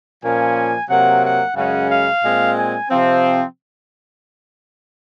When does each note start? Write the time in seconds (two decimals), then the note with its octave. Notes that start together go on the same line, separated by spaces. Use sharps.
0.23 A#2 F3 A#3 C#4 G#5
0.89 C3 F#3 A#3 F#5
1.23 F#5
1.56 F#2 C#3 G#3 C#4 F#5
1.90 F5
2.23 A#2 G#3 C4
2.57 G#5
2.90 C3 F3 C4